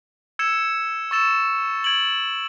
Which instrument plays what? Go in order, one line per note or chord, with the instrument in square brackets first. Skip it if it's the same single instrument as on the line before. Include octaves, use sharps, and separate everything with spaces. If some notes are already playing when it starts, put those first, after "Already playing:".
[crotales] E6 G#6 C#7 E7
C#6 E6 A6 E7
G#6 D7 F#7